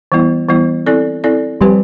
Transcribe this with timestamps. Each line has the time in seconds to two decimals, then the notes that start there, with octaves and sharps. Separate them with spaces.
0.12 E3 G3 B3 E4
0.49 E3 G3 B3 E4
0.86 C4 E4 A4 D5
1.24 C4 E4 A4 D5
1.61 F3 G3 C4 G4 B4